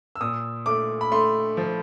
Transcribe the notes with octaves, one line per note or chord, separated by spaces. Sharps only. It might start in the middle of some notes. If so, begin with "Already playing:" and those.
E6
A#2 D#6
A3 D6
B5
A3 C6
F3